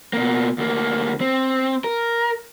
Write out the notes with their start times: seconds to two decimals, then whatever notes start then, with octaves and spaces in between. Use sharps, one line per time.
0.13 B2 A#3
0.58 D2 A#3
1.21 C4
1.84 A#4